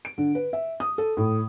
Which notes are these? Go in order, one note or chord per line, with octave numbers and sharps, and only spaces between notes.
D7
D3
B4
E5
D#6
A4
A2